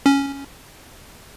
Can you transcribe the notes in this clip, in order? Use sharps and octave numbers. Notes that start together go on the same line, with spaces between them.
C#4